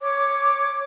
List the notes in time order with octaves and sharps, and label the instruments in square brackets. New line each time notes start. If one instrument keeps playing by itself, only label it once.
[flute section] C#5 D6